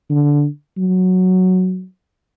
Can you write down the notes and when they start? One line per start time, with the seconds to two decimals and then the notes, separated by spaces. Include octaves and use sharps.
0.10 D3
0.78 F#3